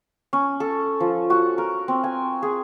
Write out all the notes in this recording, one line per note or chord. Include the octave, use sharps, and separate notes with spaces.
C#4
A4
F3
F#4
A#4
C4
G#5
G#4